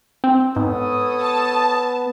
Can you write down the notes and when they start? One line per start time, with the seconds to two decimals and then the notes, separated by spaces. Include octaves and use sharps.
0.24 C4
0.56 G#2 B3 A4 C#5 D#6
1.20 A5